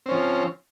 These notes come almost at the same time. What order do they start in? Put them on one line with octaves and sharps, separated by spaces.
C4 C#4 F3